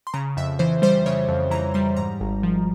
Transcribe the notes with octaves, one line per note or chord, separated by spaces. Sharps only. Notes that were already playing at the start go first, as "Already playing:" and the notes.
C6
C#3 A#5
F2 E5
E3 C5
G3 C5
C#3 C#5
F2
E3 A#5
G3 C6
G#2 A#5
G#1
F3